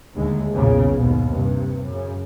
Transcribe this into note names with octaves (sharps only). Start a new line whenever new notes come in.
D#2 D3 G#3 A3
B1 E2 A#2 C#3
D#2 G#2 B2
G2 C3
F#2 C#3